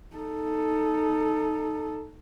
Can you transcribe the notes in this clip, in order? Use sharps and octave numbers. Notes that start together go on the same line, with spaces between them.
D#4 A4